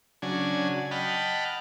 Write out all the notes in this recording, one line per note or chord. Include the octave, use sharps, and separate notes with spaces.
C#3 F#3 D4 G#5
D#5 F#5 G5 A5 B5 F6